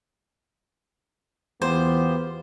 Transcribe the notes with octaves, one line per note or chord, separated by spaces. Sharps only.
E2 B3 F4 G4 C5 C6